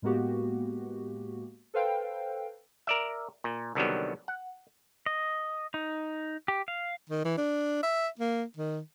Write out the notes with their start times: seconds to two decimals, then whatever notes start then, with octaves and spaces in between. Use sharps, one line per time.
0.02 A2 G#3 A#3 B3 F#4 G4
1.74 A4 B4 C5 F5 G5
2.87 A#4 D5 E5
3.44 A#2
3.75 C2 D3 D#3 F#3 G3 B3
4.28 F#5
5.06 D#5
5.74 D#4
6.48 G4
6.68 F5
7.10 D#3
7.25 E3
7.38 D4
7.83 E5
8.19 A#3
8.57 D#3